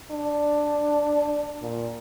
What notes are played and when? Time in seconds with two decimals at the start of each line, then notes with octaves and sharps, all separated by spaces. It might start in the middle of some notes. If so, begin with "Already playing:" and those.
0.11 D4
1.62 A#2